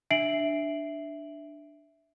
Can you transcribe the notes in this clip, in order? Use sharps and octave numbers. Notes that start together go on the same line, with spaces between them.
D4 E5 C7 D7 F#7